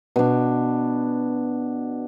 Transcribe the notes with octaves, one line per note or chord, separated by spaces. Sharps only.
B2 D4